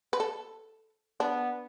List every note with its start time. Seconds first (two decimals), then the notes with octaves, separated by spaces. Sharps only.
0.13 B4
0.20 A4
1.20 B3 D4